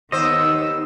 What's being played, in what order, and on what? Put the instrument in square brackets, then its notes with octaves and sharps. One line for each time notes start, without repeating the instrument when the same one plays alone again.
[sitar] D#2 C5 [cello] D#3 B3 [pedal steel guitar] D#5 [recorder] E6